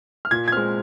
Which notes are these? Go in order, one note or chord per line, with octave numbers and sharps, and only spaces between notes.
F6
A#2 G#6
G#6
G#3 C4 F6